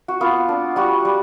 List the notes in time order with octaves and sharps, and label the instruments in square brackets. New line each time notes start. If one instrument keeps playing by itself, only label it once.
[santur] F#4
B3 F4
D4
G3 F#4
G3